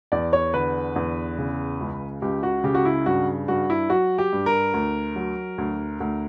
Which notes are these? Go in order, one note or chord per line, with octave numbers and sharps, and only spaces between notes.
E2 D5
C#5
D3 B4
E2
C#3
C#2
C#2 G4
F#4
C#3 G4
F#4
E4
G2 F#4
G2 F#4
E4
F#3 F#4
G4
G2
A#4
D2
F#3
D2
D2